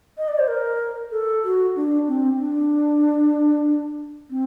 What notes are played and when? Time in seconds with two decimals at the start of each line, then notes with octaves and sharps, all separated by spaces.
0.18 D#5
0.28 D5
0.39 C5
0.48 A#4
1.12 A4
1.44 F#4
1.76 D4
2.08 C4
2.39 D4
4.30 C4